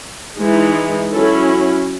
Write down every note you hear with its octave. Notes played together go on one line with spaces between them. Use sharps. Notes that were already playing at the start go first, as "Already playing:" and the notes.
E3 G#3 D#4
F#3 C#4 E4 A4